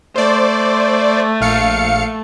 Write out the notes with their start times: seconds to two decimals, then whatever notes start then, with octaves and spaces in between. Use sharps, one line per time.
0.16 A3 C5 D5
1.41 A#1 F5 C#7